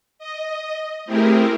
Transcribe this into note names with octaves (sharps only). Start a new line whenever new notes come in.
D#5
A3 C4 E4 G4 G#4 A#4